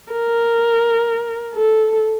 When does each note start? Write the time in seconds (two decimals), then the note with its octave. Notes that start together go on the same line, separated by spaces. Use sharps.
0.12 A#4
1.54 A4